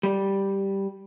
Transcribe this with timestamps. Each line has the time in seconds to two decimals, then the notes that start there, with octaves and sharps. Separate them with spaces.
0.03 G3